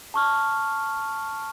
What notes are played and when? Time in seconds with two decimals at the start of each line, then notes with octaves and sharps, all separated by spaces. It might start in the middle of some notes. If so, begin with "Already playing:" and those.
0.14 A5 C#6 F6